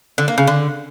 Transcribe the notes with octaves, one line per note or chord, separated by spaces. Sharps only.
D3
A#3
C#3
D3